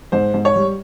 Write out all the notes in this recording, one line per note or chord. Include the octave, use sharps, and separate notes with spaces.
G#2 C5
G#2
C#5
G3